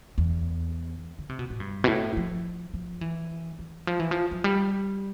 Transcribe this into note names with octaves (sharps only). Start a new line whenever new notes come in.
E2
D3
C3
B2
A2
G2
B2
A2
F3
F3
E3
E3
F3
E3
F3
F3
G3